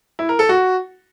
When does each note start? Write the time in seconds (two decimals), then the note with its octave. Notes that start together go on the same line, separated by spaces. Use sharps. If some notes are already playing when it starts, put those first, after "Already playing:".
0.19 E4
0.29 A#4
0.39 A4
0.49 F#4